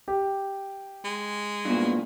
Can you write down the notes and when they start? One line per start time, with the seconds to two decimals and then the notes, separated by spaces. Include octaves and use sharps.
0.08 G4
1.05 G#3
1.65 G2 A#2 B3